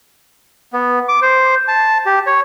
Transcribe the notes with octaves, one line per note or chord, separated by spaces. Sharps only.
B3
D6
C5
A5
G4
C#5